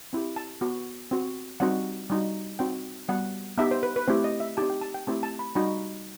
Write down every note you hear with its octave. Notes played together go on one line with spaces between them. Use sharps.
C4 E4 G4
A5
B3 F#4
C4 F#4
G3 C4 D#4 F#4 F#5
G3 D#4 F#4
C4 D#4 F#4 G5
G3 B3 F#4 F#5
B3 D#4 G4 E5
C5
B4
B4
A3 C4 E4 G4 C5
D#5
E5
C4 D#4 G4 A5
G5
A5
G5
A3 C4 E4 G4 A5
A5
B5
G3 D#4 F#4 B5